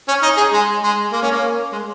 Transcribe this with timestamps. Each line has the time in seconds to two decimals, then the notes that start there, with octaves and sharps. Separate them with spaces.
0.08 C#4
0.23 D#4
0.37 G#4
0.53 G#3
0.83 G#3
1.12 A#3
1.22 C#4
1.32 A#3
1.72 G#3